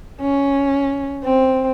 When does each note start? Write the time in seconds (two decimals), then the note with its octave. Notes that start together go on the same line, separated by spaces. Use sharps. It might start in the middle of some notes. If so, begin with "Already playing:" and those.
0.21 C#4
1.23 C4